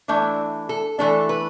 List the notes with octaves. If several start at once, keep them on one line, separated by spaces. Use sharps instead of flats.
E3 A3 D4 E5
A4
E3 A3 D4 A4
B4